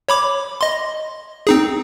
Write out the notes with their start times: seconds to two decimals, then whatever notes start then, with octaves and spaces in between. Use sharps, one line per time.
0.09 C#5 B5 D6
0.61 D#5 C6
1.47 C4 D#4 G#4